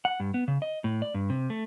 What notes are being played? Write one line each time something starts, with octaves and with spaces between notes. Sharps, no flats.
F#5
G2
B3
C#3
D#5
A2
D5
G2
C3
A3